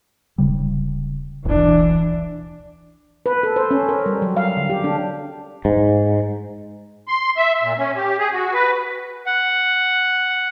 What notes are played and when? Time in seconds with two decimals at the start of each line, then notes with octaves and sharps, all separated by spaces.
0.38 D1 C#3 G3
1.45 D1 B1 E2 E3 D4
3.26 B4
3.43 A4
3.56 C5
3.71 C#4
3.89 A#4
4.06 G3
4.22 F#3
4.37 F5
4.57 D3
4.70 G4
4.84 D4
5.65 G#2
7.08 C6
7.37 E5
7.63 A#2
7.78 C#4
7.97 G4
8.19 G#4
8.33 F#4
8.54 B4
9.26 F#5